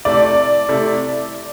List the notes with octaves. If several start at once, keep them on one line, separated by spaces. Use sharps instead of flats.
C3 A3 E4 A4 D5
C3 A3 E4 A4